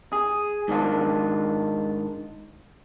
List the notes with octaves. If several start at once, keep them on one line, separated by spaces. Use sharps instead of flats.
G#4
G#2 D#3 D4 F4